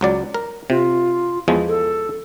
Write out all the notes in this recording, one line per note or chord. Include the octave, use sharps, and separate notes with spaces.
C#2 F#3 D5
A#4
C3 F4
E2 F3 G#3
A4